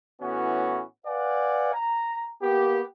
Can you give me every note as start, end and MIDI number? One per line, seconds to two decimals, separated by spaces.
0.21 0.82 45
0.21 0.82 52
0.21 0.82 59
0.21 0.82 61
0.21 0.82 66
1.07 1.72 71
1.07 1.72 74
1.07 1.72 77
1.07 1.72 78
1.07 1.72 80
1.74 2.27 82
2.41 2.82 58
2.41 2.82 59
2.41 2.82 67